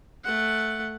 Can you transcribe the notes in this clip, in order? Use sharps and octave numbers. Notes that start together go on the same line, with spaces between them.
A3 F#5